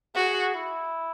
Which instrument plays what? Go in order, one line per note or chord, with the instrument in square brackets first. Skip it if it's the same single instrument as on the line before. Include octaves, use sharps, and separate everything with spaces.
[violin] F#4 [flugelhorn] G#4
[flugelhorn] E4